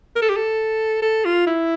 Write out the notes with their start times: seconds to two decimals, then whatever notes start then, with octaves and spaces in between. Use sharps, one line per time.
0.16 A#4
0.22 A4
0.30 G4
0.36 A4
1.02 A4
1.25 F4
1.47 E4